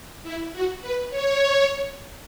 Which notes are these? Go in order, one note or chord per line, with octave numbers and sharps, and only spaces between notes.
E4
F#4
B4
C#5